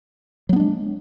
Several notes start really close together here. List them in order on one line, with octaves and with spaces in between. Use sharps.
F#3 B3 D4 G#3